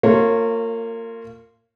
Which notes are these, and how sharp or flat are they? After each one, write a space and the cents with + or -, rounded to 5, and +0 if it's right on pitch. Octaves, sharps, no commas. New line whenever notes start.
A#3 -30 F4 +0 C#5 -15